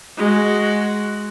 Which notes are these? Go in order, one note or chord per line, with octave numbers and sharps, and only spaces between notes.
G#3 F#4